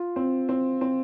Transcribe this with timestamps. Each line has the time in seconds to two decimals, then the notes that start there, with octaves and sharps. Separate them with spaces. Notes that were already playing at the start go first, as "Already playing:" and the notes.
Already playing: F4
0.16 C4
0.49 C4
0.81 C4